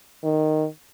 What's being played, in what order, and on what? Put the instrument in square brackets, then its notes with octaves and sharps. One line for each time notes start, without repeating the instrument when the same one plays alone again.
[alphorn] D#3